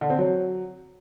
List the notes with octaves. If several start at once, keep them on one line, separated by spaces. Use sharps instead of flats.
D3
C4
F#3